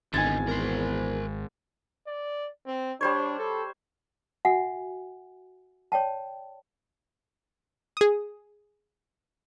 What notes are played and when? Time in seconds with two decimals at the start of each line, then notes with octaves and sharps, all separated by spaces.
0.14 G#1 E2 D3 D#4 G#5 G#6 A6
0.48 A#4 C5
2.07 D5
2.66 C4
3.01 G3 D4 C5 C#5
3.39 A4
4.45 F#4 E5 F#5 G#5
5.92 C#5 D5 G5 A5
7.97 G#4 D#6